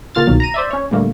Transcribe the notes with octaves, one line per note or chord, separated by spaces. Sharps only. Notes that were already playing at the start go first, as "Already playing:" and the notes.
C#3 A#3 F4 F6 A6
C2 B2 D#3 F#3
A#5 D#7
C5 D5 E5
C#4 C#5
A#2 D3 G3 A3 A#3